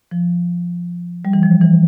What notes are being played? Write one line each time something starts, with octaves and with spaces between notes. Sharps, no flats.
F3
G3
E3
F3
E3